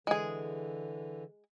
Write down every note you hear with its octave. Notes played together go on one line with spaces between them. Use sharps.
D3 E3 G#3 G#4